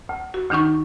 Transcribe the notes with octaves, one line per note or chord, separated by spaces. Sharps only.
D2
F#4
D2 D#3 D4 D#4 C#6